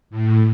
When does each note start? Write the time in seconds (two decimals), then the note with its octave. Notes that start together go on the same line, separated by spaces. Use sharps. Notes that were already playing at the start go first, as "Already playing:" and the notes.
0.10 A2